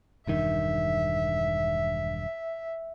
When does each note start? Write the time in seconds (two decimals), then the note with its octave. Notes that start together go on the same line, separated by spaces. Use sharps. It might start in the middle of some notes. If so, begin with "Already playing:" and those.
0.27 E1 G2 D#3 E5